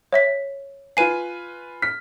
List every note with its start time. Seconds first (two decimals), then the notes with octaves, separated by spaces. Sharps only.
0.12 C#5 E5 B6
0.97 F4 B4 G#5 C7 D#7
1.82 F6 B6